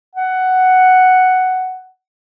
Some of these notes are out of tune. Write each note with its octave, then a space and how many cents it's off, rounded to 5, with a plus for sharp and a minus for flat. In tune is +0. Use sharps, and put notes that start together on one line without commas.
F#5 +5